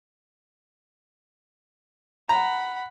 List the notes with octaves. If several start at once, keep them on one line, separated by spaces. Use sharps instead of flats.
F#5 A#5 B5